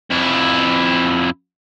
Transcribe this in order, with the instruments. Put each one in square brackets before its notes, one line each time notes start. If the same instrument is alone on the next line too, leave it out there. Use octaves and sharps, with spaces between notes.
[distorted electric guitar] F2 E4